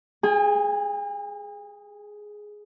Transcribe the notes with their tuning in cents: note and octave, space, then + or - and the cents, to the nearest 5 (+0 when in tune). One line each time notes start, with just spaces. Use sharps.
G#4 +5 G#5 -45